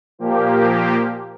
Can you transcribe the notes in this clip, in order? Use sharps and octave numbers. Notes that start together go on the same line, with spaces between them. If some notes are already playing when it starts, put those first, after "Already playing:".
A#2 F3 A#3 G4